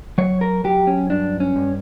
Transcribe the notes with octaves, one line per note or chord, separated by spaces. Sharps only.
F#3 C#5
A#4
F#3 G4
C#4
G2 D4
C#4
G2